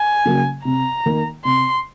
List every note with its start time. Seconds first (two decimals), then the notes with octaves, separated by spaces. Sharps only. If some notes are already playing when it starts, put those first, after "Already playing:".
Already playing: G#5
0.25 C#3 F#3 A#3
0.65 C3 A#5
1.06 D#3 A#3
1.45 C3 C6